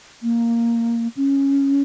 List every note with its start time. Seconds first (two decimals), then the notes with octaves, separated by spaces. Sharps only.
0.23 A#3
1.17 C#4